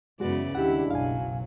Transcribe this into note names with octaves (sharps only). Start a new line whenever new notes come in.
F#2 C#3 E3 G#3 B3 F#4 D5
D#2 C#3 G3 G#3 D4 E4 G4 F#5
F#1 B1 F#3 F5 G#5